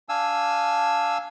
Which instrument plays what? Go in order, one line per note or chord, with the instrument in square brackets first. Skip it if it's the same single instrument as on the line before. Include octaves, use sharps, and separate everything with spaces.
[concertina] D4 F5 G#5 E6